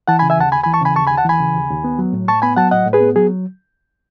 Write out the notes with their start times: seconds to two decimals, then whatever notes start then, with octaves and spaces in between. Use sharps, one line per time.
0.08 E3 F#5 A5
0.19 G#5 B5
0.22 C#3
0.30 E5 G#5
0.38 D#2 F#5 A5
0.52 D#2 G#5 B5
0.63 E3 G#5 B5
0.73 A5 C#6
0.81 C#3 G#5 B5
0.96 D#2 A5 C#6
1.07 G#5 B5
1.10 D#2
1.17 F#5 A5
1.25 E3 G#5 B5
1.40 C#3
1.55 D#2
1.70 D#2
1.84 B3
1.99 F#3
2.13 A2
2.28 A2 A5 C#6
2.42 B3 G#5 B5
2.57 F#3 F#5 A5
2.71 A2 D#5 F#5
2.86 A2
2.93 G#4 B4
3.00 B3
3.16 F#3 G#4